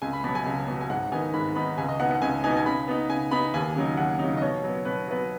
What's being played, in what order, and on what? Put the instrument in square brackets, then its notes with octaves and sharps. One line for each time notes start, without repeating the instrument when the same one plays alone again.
[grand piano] C#2 G#5
B5
B2 F#3 B5
G#5
C#2
B2 F#3
G#5
G#2 F#5
D#3 B3 D#4 G#5
G#2 B5
D#3 B3 D#4 B5
C#2 G#5
D#5
B2 B3 D#4 F#5
F#5
C#2 G#5
B2 B3 D#4 G#5
G#5
C#3 B5
B3 D#4
C#3 G#5
B3 D#4 B5
D#2 G#5
C#3 F#3 D#4
D#2 F#5
C#3 F#3 D#4
D#5
B2 C#5
F#3 B3
B2 B4
F#3 B3 B4